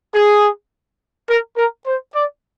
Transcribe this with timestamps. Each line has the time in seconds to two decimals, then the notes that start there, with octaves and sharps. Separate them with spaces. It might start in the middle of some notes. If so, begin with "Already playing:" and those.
0.14 G#4
1.29 A#4
1.57 A#4
1.87 C5
2.15 D5